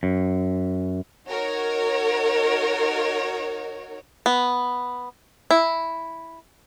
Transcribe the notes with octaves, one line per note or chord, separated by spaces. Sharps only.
F#2
D#4 F#4 A#4 C#5
B3
E4